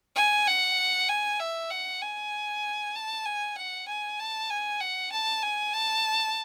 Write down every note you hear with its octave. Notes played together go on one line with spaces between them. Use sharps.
G#5
F#5
G#5
E5
F#5
G#5
A5
G#5
F#5
G#5
A5
G#5
F#5
A5
G#5
A5